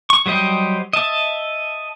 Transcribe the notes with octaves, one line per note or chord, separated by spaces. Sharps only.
C#6
F#3 G3 C5 D#5 G5
D#5 E5 A5